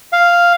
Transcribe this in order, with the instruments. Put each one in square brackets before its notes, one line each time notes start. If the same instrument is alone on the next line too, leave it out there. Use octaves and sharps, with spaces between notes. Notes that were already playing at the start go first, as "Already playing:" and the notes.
[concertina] F5